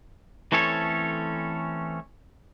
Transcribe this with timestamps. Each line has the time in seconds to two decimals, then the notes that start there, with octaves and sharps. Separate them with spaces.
0.52 E3 A3 C4 C#4 A4 C#5